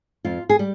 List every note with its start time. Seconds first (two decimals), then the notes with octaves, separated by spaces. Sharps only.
0.25 F2 F4
0.49 G#4
0.59 G3 G4